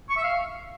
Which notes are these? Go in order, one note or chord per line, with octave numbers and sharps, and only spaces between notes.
C#6
E5
F5